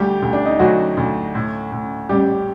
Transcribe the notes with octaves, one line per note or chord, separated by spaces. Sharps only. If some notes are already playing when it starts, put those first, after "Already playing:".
Already playing: D2 G3 G4
D2
D4
D#4
D2 F#3 F#4
D2
A2
A2
A1 G3 G4